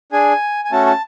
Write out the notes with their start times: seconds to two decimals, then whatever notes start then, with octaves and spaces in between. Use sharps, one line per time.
0.12 D4 G#4 G#5
0.65 G#5
0.71 A3 C#4 F#4 A4 A5
0.86 A5